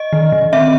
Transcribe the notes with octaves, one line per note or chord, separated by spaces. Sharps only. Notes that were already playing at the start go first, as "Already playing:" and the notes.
Already playing: D#5
D#3
D#3
C4 E5